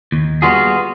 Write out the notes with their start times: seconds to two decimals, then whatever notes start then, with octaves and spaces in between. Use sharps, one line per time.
0.12 D#2
0.42 G3 B3 F4 F#4 G#4